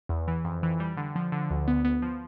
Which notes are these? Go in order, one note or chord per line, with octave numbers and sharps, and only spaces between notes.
E2
E3
F2
E3
G3
D3
F3
D3
D2
B3
B3
F3